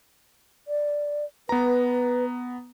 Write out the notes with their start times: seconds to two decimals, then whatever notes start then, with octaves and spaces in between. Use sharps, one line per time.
0.68 D5
1.49 B3 B4 A#5